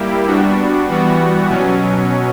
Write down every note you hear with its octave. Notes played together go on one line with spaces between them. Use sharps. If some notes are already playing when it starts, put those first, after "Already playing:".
Already playing: G3 A#3 E4 G4
G3 B3 D4 F#4
E3 G3 B3 F#4
B2 F#3 C#4